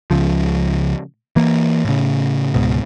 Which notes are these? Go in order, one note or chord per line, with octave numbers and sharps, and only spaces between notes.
C#2 C#3 F3
E3 A#3
A2 C#3
C#2 G#2 B2